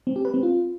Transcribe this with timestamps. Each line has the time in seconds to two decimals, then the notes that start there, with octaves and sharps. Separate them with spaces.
0.07 C4
0.16 G4
0.25 B4
0.34 C4
0.43 F4